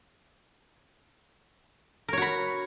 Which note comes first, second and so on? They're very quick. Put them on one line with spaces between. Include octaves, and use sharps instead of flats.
A#4 C#5 F#4 B5